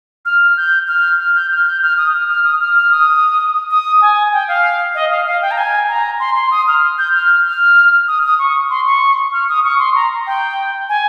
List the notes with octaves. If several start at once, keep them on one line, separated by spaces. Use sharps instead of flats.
F6
G6
F6
F6
G6
F6
G6
F6
D#6
F6
F6
D#6
F6
F6
D#6
D#6
G#5
G5
F5
D#5
F5
F5
G5
A#5
G#5
A#5
C6
C6
D#6
F6
G6
F6
F6
D#6
D#6
C#6
C6
C#6
F6
D#6
C#6
C6
A#5
G5
G#5